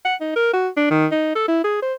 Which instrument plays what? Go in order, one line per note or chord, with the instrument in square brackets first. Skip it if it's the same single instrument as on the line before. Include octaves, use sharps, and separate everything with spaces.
[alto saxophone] F#5
D#4
A#4
F#4
D4
D#3
D#4
A4
E4
G#4
C5